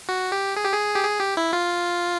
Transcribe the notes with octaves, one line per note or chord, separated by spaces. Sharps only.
F#4
G4
G#4
G4
G#4
G4
G#4
G4
E4
F4